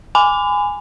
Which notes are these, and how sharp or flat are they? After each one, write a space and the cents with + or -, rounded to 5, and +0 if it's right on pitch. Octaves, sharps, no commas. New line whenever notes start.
G#5 -10 B5 +40